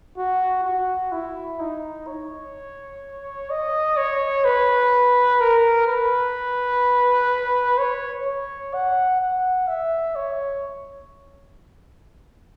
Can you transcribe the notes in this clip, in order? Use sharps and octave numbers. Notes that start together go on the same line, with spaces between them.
F#4
F#4
E4
D#4
C#5
D#5
C#5
B4
A#4
B4
C#5
C#5
F#5
F#5
E5
C#5